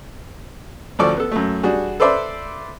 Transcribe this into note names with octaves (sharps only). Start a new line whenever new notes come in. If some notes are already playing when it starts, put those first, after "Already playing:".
A1 D2 F3 A4 D5 C#6
B3 A4
F#2 A3
G3 D4 F#4 G#4
A4 B4 C5 D5 E5